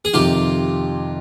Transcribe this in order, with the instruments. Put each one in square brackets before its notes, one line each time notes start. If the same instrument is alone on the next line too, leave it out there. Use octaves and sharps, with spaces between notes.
[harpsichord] G#4
[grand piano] F2 C3 D#3 [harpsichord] F4 G4